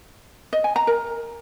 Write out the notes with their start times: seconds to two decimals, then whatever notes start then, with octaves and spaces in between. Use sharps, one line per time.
0.53 D#5
0.64 G#5
0.76 A#5
0.87 A#4